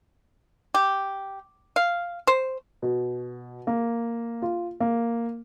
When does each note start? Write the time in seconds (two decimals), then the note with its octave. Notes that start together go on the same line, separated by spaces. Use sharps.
0.74 G4
1.76 F5
2.27 C5
2.82 B2
3.67 A#3
4.42 F4
4.80 A#3